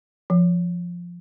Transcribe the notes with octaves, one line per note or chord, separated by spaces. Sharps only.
F3